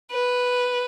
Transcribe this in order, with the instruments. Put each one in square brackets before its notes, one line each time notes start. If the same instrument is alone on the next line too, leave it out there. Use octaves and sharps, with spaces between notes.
[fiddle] B4